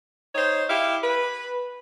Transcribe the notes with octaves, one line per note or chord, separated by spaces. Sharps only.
D#4 C5 C#5
E4 G4 F5
B4